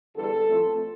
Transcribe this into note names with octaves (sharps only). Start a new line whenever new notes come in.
E2 D3 G3 A4
A2 F3 A3 C4